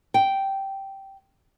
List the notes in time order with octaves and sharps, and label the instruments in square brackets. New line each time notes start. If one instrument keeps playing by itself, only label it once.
[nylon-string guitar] G5